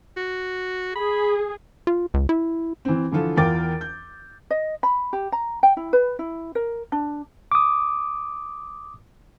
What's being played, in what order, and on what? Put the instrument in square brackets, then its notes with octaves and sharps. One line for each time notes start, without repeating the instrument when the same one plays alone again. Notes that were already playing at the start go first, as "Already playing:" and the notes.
[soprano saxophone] F#4
[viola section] G#4 [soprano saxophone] B5
[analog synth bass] F4
C#2
E4
[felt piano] E3 C4
D3 E3 F3 F4 A4
E2 F4 A#4 G5 D6 A6
G6
[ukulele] D#5
B5
G4
A#5
G5
E4
B4
E4
A#4
D4
[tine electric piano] D6 D#6